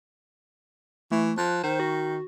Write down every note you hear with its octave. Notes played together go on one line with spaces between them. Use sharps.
E3 A3
F3 F#6
D#3 C5
F#4